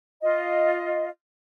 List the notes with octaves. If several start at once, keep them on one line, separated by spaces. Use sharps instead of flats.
F4 D#5